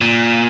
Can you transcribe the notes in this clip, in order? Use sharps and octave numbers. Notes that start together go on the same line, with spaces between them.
A#2